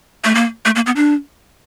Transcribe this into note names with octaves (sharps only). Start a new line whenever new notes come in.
A3
A#3
A3
A#3
B3
D4